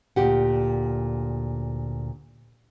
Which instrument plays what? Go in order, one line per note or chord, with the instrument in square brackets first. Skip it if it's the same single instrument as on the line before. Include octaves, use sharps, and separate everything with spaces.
[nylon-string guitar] D2 A#2 G4 F#5